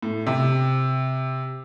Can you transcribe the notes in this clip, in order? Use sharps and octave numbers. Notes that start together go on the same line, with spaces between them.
A2
C3